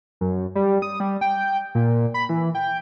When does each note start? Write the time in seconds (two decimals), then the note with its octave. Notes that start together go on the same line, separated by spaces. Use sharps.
0.21 F#2
0.55 G3
0.82 D#6
1.00 G3
1.21 G5
1.75 A#2
2.14 B5
2.29 E3
2.55 G5